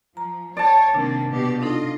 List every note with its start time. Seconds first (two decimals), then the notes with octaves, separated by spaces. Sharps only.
0.17 F3 A#5
0.57 C#5 D5 A5
0.94 C3 D#3 A#3 C4 D4
1.30 B2 G4
1.62 D4 D#4 F4 A4 D#5